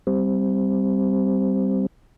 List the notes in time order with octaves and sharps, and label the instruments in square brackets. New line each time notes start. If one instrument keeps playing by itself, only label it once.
[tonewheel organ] G3 C4